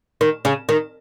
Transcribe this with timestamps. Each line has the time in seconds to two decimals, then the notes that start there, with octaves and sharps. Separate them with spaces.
0.21 D#3
0.45 C#3
0.69 D#3